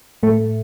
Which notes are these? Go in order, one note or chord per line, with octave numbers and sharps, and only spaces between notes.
A2 A3